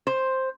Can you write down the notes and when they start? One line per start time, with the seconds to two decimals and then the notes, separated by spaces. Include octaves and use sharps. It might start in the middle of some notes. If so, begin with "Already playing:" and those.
0.07 C5